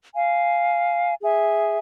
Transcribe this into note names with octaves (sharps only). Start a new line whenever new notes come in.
F5 G#5
G#4 E5 G#5